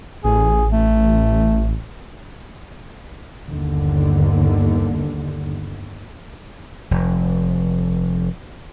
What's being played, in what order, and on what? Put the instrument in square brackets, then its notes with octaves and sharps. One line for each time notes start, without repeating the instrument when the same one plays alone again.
[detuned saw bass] A1 [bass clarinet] G#4
[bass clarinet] A3
[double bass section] G1 D#2 D3
[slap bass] F1 F2